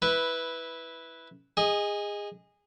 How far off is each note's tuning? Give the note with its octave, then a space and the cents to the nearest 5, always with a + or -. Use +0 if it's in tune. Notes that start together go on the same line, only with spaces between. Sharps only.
E4 -10 B4 +0
G#4 -20 D#5 +0